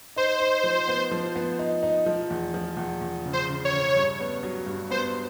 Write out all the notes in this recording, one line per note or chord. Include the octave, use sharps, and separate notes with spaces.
D#4 C5
D#4
F3
B3
F3
B3
D#4
D#4
F3
E2
F3
E2
E2
C#3
C5
C#3
C#5
C#3
G2
B3
F#3
G2
B3 C5